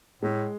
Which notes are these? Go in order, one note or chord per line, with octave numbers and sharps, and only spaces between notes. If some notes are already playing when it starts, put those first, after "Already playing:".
A2 G#3